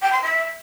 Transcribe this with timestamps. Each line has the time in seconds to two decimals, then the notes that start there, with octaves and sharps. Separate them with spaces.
0.02 G5
0.12 C6
0.22 E5